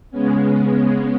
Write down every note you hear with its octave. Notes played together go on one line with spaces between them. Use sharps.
C#3 G#3 B3 C#4